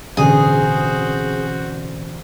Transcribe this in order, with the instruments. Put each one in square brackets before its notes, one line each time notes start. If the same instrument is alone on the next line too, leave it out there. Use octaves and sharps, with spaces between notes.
[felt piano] E1 A1 D3 [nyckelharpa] C4 F#4 [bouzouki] G#4